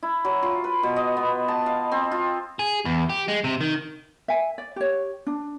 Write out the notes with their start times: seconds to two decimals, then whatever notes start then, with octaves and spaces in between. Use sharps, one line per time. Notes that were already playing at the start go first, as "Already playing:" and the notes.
0.03 E4
0.25 F#3
0.42 F4
0.64 B4
0.83 B2
0.96 D#5
1.17 B3
1.48 A5
1.66 F5
1.92 C4
2.12 F4
2.59 G#4
2.85 E2
3.10 G4
3.28 G#3
3.44 C3
3.61 D#3
4.28 E5 G#5
4.58 D5
4.76 G4 C#5
5.27 D4